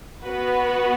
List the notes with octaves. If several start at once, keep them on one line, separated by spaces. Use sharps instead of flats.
B3 F#4 B4